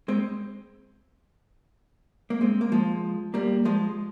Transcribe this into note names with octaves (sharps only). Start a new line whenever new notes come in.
G#3 C4
A#3
G#3 C4
A#3
F3 G#3
G3 A#3
F3 G#3